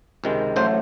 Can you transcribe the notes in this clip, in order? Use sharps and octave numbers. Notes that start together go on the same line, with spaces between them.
C#2 C3 D#3 G#3
A1 A2 F#3 A3 C5